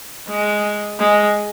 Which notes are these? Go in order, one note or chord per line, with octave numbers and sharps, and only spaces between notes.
G#3
G#3